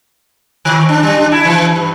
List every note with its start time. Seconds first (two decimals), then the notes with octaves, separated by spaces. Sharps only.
0.65 D#3
0.89 D4
1.03 G3
1.17 D4
1.32 E4
1.45 E3
1.76 G2